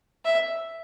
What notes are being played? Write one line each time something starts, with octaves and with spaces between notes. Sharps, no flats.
E5